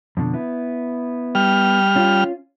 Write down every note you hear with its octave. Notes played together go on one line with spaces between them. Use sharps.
F2 B2 D3
B3 E4
G3 F6
C#4 F4